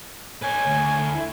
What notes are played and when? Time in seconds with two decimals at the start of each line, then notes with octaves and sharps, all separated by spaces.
0.43 B4 C#5 G#5
0.67 D2
1.14 E4